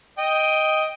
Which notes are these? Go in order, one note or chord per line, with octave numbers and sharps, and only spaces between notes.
D#5 G5